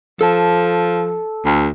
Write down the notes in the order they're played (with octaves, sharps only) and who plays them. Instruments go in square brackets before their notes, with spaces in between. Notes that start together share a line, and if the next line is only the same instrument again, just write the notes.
[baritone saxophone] F3 [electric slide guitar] A4 A5
[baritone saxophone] D2